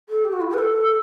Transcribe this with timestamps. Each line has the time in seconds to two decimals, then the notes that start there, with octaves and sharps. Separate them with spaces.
0.09 A4
0.25 G4
0.33 F#4
0.41 E4
0.49 G4
0.54 B4
0.58 A4